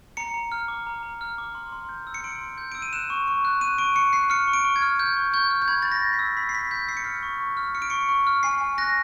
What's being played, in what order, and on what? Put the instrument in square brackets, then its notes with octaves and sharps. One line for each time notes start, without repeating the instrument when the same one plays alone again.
[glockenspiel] A#5 C#7
A#5
F6
D6
A#5
A#5
F6
D6
C6
C6
G6
E6
C#7
C6 D7
C6
G6
E6 D7
D#7
F#6 E7
C#6
C#6
F#6
F#6 D#7
C#6 D7
C#6 C#7
F#6 C7
F6 C#7
C#6
D7
C#6
G#6
F6
F6 G6
C#6
C#6 G6
F6
G6
B5 G#6
B5 A6
A#6
G6
B6
E6
B5 B6
C7
B5 B6
G6 B6
E6 C7
C#7
F6 C7
C#6
C#6
F6
F6 C#7
D7
C#6 C#7
C#6
F6
G#5 C7
G#5
F#6 A#6